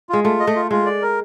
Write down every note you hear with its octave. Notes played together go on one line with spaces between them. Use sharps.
G#3 F4
A3 F4
D#5
A3
F4
G#3 F4
D5
A#4